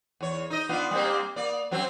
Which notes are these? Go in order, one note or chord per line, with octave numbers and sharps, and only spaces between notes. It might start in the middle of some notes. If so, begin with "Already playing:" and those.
E2 C#5
D#4 D#5
B3 D4 F4
G3 A#3 C4
A#3 D5
F#2 F#3 C4